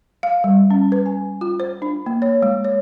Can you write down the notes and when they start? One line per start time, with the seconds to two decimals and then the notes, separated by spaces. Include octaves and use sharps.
0.23 F5
0.44 G3
0.71 C#4
0.92 B4
1.06 G#5
1.41 F4
1.60 C5
1.82 D4
2.06 A#3
2.22 C#5
2.42 G#3
2.65 C#5